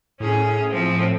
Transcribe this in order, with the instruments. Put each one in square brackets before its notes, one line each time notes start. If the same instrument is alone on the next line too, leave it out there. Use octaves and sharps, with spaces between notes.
[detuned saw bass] A2 [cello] C#4 G#4
[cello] F3 C4